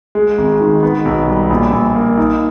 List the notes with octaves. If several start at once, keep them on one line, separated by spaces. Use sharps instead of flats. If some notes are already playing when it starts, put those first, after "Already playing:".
G#3
G#1
D#3
B3
B1
G3
A#1
A#1
A#3
D#4